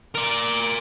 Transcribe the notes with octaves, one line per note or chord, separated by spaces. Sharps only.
A#4 D5